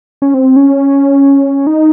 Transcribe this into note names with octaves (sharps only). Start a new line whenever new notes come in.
C#4
C4
C#4
D#4